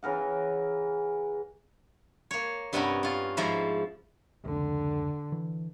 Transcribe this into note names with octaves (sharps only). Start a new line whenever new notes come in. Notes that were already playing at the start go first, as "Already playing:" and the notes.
C#3 E3 A#4 F#5
A#3 C#5
G2 C3 B3 C#4 A#4 B5
C#4 F4
G#2 F3 E4 E5 A#5
F1 C#2 D3
E3